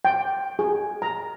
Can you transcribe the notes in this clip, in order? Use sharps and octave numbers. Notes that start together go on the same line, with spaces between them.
G5
G#4
A#5